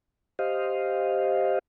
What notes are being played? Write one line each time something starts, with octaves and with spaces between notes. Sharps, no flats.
G4 C5 D#5 F5